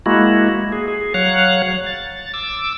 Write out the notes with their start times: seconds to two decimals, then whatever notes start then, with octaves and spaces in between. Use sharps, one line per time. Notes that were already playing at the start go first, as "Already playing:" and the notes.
0.06 G#3 A#3 E4 F#4
0.72 G#4
0.88 G#4
1.14 F#3 C#5 F5 F#6
1.86 A6
2.34 D6 E6